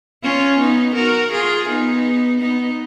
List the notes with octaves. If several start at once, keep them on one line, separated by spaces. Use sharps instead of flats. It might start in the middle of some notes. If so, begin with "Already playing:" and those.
C#4 F4
B3 D#4
F#4 A#4
F4 G#4
B3 D#4
B3 D#4